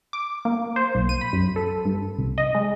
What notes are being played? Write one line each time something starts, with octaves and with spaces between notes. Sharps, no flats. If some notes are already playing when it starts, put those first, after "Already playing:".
D6
A#3
C5
B1
D#7
B5
F#2
A4
G2
C2
D#5
G#3